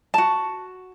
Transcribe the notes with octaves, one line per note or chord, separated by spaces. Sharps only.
F#4 A5